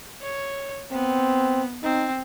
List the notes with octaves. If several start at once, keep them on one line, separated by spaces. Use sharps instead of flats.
C#5
B3 C4
C4 D#4